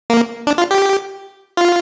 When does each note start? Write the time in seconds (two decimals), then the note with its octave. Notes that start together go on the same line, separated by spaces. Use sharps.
0.10 A#3
0.47 D4
0.58 F4
0.71 G4
1.57 F4